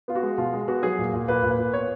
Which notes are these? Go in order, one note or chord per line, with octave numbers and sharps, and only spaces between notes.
B3 F4
F#4
G#3
B2 F4
G#3
B3 F#4
F#3 G#4
A#2
A#2
A#2 B4
A#2
B4
A#2
B3 C#5